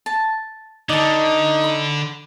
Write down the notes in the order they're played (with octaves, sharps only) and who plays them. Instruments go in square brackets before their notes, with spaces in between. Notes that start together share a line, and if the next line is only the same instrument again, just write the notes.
[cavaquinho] A5
[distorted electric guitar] D3 [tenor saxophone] D#4 [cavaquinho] D5 A5
[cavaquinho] B5